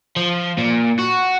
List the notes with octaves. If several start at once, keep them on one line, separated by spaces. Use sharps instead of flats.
F3
A#2
F#4